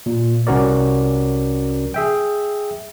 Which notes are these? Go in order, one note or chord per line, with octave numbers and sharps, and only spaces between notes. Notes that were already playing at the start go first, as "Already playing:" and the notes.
A#2
C2 C#4 F#4 A#4 D5
G#4 E5 G5